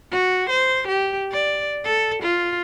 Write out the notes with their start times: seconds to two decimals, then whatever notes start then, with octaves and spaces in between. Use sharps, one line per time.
0.11 F#4
0.49 C5
0.87 G4
1.32 D5
1.84 A4
2.22 F4